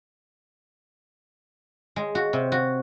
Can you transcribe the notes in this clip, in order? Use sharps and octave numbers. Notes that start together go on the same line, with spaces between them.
G#3
F#4
C3
F#4